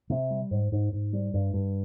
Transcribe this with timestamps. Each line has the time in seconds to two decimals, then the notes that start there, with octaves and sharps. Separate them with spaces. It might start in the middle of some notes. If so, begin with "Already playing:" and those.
0.10 C3
0.30 G3
0.51 G#2
0.72 G#2
0.92 G#2
1.13 G3
1.34 G2
1.54 G2